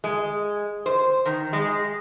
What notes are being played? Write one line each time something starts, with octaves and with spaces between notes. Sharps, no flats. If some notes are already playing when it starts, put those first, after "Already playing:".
G#3
C5
D#3
G#3